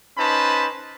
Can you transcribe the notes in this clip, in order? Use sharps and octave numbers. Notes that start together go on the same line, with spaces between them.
C#4 D#4 B4 C5 A5 B5